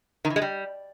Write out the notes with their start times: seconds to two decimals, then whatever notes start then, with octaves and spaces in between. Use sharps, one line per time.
0.25 D#3
0.30 E3
0.36 G#3
0.42 G3